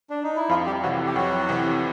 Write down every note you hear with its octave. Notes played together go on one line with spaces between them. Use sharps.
D4
D#4
E4
F2 F3 F4
G3 G4
C3 E3 F#3 F#4
G4
F2 F#3 F#4
C3 E3